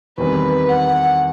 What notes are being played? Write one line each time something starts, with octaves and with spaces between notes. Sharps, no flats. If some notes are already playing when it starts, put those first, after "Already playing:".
E2 D#3 G3 C4 B4
F#5